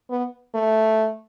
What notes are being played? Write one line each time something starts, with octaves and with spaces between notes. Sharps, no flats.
B3
A3